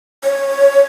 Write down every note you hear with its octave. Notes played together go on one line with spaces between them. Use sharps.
C#5